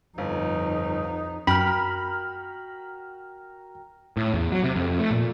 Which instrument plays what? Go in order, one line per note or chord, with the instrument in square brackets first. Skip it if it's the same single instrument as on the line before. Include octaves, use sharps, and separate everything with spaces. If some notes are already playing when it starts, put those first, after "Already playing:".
[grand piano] G1 [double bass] F2 D#4
[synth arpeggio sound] F#2 [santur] F#4 A#4 [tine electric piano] G5 F6 [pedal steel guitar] B5
[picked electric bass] A2
E2
F#3
C3
F2
A3
A#2